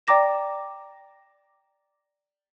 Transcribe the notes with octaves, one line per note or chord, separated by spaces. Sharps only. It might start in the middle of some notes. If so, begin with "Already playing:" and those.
D5 G5 A#5 D6 A#6 E7